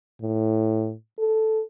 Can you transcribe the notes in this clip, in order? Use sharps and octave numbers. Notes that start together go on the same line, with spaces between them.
A2
A4